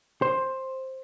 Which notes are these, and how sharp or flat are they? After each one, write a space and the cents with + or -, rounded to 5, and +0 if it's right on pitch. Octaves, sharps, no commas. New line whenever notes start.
C5 +10